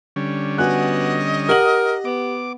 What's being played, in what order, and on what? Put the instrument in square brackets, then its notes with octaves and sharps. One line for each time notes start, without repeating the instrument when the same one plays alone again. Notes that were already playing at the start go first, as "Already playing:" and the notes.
[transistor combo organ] D3 G3 C#4
[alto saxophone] B3 [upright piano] F#4 G#5 F#6 [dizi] D#5
[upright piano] G4 F#5 F#7 [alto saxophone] A#4
[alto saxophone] B3 [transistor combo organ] D6